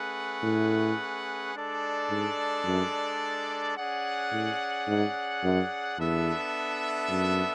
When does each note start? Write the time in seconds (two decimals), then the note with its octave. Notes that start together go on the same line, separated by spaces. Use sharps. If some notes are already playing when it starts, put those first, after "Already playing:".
Already playing: A3 C#4 G#4 B4 F#5
0.43 A2
1.54 G#3 D4 A4 D5
2.10 G#2
2.65 F#2
3.76 C#4 G#4 D5 F#5
4.32 A2
4.87 G#2
5.44 F#2
5.98 E2 B3 D4 A4 E5
7.09 F#2